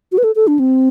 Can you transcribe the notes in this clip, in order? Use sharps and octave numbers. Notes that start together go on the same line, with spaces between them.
F#4
B4
A4
A4
D4
C4